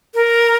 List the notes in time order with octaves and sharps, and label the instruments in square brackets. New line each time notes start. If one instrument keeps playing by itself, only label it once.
[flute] A#4